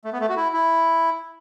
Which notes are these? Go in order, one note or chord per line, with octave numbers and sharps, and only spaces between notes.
A3
B3
A3
F#4
E4
E4